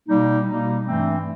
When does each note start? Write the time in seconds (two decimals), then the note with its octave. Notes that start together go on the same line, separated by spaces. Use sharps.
0.07 B2 G3 A#3 D#4
0.46 B2 G3 A#3 D#4
0.85 G2 E3 A3 C4